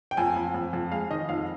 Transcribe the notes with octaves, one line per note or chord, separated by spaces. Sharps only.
G5
F2 G#5
F2
F2
F2
G#3 F5
D#3 D#5
F2 F5